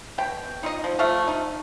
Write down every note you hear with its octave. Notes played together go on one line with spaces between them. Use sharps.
B2 G5
D#4 F4 D#5
F3
F3 A3 F4 F5
D#4